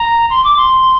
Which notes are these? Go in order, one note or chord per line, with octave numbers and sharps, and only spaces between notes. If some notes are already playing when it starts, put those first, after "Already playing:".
Already playing: A#5
C6
D6
C6